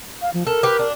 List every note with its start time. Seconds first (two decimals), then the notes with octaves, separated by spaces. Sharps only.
0.22 F5
0.34 F3
0.47 A4 A#4
0.63 G4 B4
0.79 D4